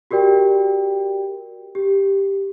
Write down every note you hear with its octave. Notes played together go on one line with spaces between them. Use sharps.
F#4 G4 A#4 D5 G5
G4